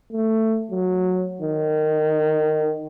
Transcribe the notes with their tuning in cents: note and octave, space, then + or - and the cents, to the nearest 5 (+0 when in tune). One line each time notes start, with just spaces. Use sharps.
A3 +10
F#3 -15
D#3 -15